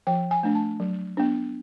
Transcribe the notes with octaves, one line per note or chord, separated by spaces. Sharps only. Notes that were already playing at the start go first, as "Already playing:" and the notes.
F3 G5
G#5
A3 D4
A5
F#3
B3 D4